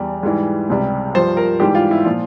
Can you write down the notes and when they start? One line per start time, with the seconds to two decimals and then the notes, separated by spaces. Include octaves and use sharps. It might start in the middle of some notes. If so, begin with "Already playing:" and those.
Already playing: E2 G3
0.23 G#2 E3 G3
0.70 C#2 C3 G3
1.14 G2 F3 C5
1.37 A#4
1.60 G#2 E3 G3 G4
1.75 F4
1.91 E4
2.05 A#2 F3 F4